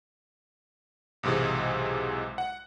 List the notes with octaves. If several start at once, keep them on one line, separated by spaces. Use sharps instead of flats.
B1 G#2 C3 E3 G#3
F#5